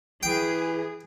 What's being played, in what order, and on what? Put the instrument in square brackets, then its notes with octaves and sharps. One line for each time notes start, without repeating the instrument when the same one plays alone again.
[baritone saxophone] E3 [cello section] G#4 [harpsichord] G5